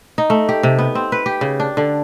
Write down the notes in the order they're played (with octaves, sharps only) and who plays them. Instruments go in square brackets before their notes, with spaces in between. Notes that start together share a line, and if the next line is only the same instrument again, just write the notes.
[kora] D#4
A3
G4
C3
B3
C4
B4
G4
C#3
D4
D3